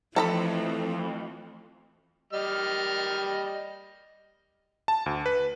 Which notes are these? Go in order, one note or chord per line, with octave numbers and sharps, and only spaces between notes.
F2 E3 F3 A3 A4 A#5 B5
G3 D#5 F6
A5
D2
B4